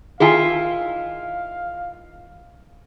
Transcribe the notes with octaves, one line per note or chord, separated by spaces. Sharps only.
D#3 E4 F4 G#4 F5 G5 G#5